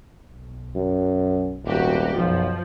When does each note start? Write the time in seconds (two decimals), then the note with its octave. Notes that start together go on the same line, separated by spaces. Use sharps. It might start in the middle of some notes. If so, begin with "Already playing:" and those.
0.24 B1
0.76 F#2
1.65 D#1 G#1 F#4 G4
2.17 B1 F#2 F3